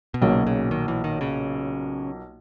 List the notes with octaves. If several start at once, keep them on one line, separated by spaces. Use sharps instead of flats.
B2
B1 A#2 C#3 F#3
C#3
D#3
E3
D#3
C#3